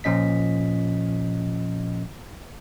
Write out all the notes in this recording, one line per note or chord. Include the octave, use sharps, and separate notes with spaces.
A#2 F3 C#4 D#5 B6